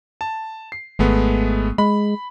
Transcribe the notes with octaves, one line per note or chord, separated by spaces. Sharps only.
A5
C7
G#1 G#3 A3 B3
G#3 B5